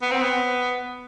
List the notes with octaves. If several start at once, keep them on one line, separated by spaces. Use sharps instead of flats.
B3
C4
B3